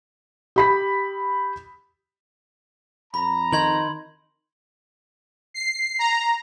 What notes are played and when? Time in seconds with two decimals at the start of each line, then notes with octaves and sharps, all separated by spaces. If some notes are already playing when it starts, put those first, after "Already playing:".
0.56 G4 B5 B6
3.14 F2 A#5 B5
3.53 D#3 D#4 C6 G#6 F#7
5.54 C7
5.99 A#5